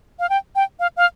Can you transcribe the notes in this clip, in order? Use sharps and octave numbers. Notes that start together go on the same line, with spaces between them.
F5
G5
G5
F5
F5